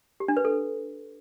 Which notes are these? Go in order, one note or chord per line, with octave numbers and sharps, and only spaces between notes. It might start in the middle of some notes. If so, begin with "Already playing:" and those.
G4
D4
B4
A4